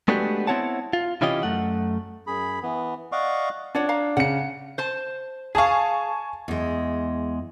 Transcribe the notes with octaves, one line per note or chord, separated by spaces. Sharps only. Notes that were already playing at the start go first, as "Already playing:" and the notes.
G#3 A3 B3 D4 F#4 G4
B3 C4 E4 C#5 F#5 A5
F4
C3 E3 C#4 F4 G4 D#5
F#2 A3 F#5
F#2 G#4 B5
E3 B3
D5 D#5 F5 F#5 C#6 D6
D4 F4 C#5 F#5
F5 A#5
C#3 F#5 C#7
C5 A5
G#4 F5 G#5 A5 C#6
E2 G#3